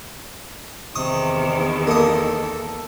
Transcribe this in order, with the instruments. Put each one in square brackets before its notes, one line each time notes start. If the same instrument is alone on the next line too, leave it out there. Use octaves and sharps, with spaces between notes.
[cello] E2 D#3 [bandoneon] C3 [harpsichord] C#6 D#6
[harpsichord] A#3 D#5 [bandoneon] A4